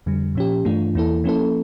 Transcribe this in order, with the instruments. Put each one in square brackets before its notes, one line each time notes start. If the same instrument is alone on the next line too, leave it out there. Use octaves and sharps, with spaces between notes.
[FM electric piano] F2 D3 G3
A#2 F3 C#4 G4
G2 E3 A3 D4 F4
E2 E3 A#3 E4 A4
F3 A#3 C#4 E4 A4